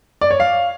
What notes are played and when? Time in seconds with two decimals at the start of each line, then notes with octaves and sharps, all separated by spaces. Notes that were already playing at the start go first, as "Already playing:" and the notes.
0.21 D5
0.31 C#5
0.40 F5